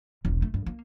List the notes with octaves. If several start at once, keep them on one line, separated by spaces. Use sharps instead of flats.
E1 C2
A3
G2
A#3